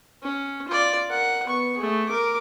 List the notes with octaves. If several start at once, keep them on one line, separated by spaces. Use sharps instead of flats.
C#4
F4 D5
A#4 F#5
B3 C#6
A3 G#4
A#4 D6